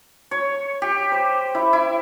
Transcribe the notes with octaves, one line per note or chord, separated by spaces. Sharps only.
C#5
G4
C5
E4
E4